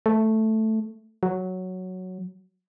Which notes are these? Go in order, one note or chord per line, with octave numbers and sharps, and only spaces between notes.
A3
F#3